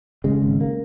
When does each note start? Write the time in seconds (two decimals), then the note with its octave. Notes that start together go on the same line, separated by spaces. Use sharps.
0.24 C#3 G#3
0.42 G#1
0.61 A#3